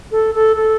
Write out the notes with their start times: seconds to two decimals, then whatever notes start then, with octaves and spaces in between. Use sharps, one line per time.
0.12 A4
0.35 A4
0.56 A4